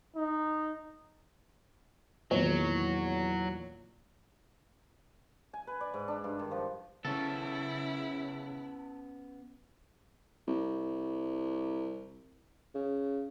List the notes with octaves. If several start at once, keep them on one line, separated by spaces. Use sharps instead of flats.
D#4
E2 A#2 D#3 F#3 C#5
G#5
B4
D5
G#2
D4
G2
D#3
F3
C#3 B3 C#4 E4 A4
C2
C#3